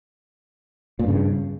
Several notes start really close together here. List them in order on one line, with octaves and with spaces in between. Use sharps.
A#2 G2 C#3